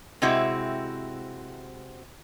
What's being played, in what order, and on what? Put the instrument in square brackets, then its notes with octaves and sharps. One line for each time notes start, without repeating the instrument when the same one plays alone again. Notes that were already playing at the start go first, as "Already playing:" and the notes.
[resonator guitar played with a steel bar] C3 G#3 C4 E4 F#4